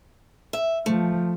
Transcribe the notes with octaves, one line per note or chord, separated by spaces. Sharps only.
E5
F3 A3